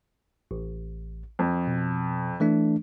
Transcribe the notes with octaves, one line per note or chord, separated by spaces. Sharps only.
A1
F2
B2
E3 A3 D4